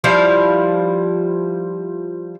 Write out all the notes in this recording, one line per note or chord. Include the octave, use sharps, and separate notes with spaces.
F3 G3 E4 F5